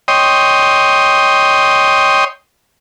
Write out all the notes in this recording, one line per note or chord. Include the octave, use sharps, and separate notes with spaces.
C#5 D#5 G5 C6 D#6